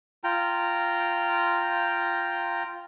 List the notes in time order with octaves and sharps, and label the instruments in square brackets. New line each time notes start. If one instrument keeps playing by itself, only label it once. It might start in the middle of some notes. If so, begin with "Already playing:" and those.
[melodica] F4 G5 A#5